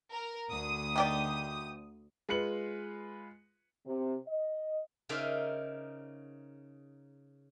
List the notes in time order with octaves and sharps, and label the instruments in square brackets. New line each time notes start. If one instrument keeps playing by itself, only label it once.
[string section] A#4
D2 D#6
[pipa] D#3 G4 D5
[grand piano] G#3 F4 B4 C#7 F#7
[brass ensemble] C3
D#5
[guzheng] C#3 D#4 A#4 C5 D5 E5